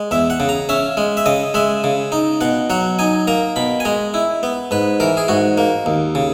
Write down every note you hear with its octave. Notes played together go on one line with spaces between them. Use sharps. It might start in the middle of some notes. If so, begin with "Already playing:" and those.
Already playing: G#3
E2 E5
F#5
C#3
A#5
C#4 E5
G#3
E5
C#3 D#5
G#3 E5
C#3
D#4
B2 F#5
F#3 F#5
D#4 G#5
A#3 A#5
B2 B5
G#5
G#3 A#5
E4
B3
G#2 B4
E3 A#4
G#4
G#2 F#4
A#3
D#2
C#3